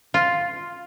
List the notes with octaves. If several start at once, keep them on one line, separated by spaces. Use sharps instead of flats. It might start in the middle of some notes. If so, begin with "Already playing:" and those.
F4